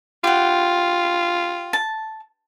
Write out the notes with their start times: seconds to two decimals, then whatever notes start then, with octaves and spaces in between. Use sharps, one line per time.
0.24 F4 G4 F#5
1.73 A5